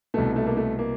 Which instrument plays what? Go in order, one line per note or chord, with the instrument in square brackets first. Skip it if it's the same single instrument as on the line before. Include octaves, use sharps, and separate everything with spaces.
[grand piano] C2 B2 A3
A3
A#3
A3
A#3